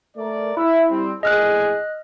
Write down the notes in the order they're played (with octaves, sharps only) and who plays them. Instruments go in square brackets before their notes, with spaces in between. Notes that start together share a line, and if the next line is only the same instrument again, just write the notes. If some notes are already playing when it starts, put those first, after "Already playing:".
[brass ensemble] A3 A#4 D5
[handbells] E4 [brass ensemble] E5
[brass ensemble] G3 C4
[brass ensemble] A#1 A2 G#4 [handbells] D#5 F6 F#6